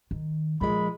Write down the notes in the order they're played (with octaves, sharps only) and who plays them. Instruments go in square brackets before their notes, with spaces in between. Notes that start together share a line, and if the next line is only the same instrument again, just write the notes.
[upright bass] D#3
[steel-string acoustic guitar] A#2 G#3 [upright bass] F3 [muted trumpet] B5